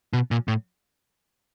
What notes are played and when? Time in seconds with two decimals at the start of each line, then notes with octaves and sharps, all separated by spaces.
0.13 B2
0.31 A#2
0.48 A2